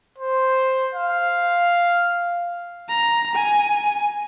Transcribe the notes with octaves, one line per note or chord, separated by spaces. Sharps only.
C5
F5
A#5
G#5